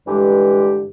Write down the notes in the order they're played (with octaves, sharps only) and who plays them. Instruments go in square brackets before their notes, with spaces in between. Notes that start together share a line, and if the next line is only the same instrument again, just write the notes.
[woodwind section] G2 D3 E3 G#3 G4